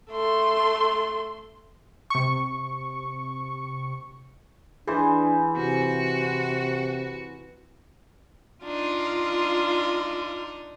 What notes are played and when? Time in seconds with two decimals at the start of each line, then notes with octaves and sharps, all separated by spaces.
0.12 A3 C6
2.10 C3 C#6
4.87 E3 D4 G#4 C5
5.57 C3 C4 F#4
8.64 D4 D#4 F4